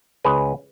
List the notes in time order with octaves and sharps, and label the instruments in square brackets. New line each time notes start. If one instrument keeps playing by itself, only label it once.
[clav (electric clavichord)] C#2 G#4 B4